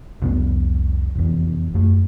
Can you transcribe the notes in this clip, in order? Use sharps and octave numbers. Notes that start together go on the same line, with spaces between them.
F1 C2 B3
F1 E2
F#2 A3